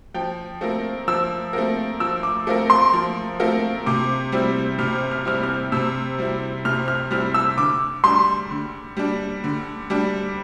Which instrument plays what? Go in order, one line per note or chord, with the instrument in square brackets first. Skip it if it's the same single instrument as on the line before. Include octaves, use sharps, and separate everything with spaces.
[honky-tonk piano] F3 [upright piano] G5
[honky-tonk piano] A3 C4 F4 A#4
[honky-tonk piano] F3 [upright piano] E6
[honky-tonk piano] A3 C4 F4 A#4
[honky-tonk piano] F3 [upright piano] E6
[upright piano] D6
[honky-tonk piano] A3 C4 F4 A#4
[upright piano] C6
[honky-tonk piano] F3
A3 C4 F4 A#4
[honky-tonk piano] C3 [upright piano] D6
[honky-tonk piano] G3 C4 E4
[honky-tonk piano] C3 [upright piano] F6
[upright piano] F6
F6
[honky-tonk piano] G3 C4 E4 [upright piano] F6
[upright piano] F6
[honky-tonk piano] C3 [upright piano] E6
[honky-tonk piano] G3 C4 E4
[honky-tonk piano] C3 [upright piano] F6
[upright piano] F6
[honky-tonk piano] G3 C4 E4 [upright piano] F6
[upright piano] E6
[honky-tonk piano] D3 [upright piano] D6
[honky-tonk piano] G3 D4 [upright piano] C6
[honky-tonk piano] D3
G3 D4
D3
G3 D4